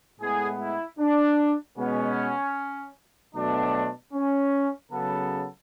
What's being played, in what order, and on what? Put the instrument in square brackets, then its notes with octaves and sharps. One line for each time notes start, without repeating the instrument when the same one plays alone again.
[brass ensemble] A2 G#3 B3 G#4
E4
D4
B2 G#3 B3 C#4
B2 F#3 A3 D4
C#4
C#3 F#3 B3 A4